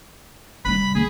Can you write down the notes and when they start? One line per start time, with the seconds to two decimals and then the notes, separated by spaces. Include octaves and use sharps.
0.65 C3 G3 B5
0.95 C3 G#4